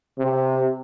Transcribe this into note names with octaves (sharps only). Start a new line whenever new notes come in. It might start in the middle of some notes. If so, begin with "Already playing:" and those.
C3